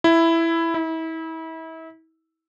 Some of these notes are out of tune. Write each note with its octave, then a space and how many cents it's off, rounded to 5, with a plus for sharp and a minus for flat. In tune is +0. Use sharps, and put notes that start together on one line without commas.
E4 +5
E4 -35